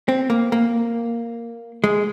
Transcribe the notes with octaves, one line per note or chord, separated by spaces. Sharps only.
C4
A#3
A#3
G#3